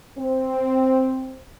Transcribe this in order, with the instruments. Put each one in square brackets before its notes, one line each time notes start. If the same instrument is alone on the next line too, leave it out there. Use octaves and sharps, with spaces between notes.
[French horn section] C4